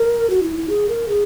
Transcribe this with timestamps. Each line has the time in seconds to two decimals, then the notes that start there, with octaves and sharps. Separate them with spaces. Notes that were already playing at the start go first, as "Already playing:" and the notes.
Already playing: A#4
0.30 F#4
0.43 E4
0.56 E4
0.69 G#4
0.89 A#4
1.08 G#4